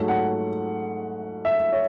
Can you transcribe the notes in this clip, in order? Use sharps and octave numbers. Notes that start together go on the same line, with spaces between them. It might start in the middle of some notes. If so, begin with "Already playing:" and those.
Already playing: G#2 F#3 A3
F#5
E5
C#5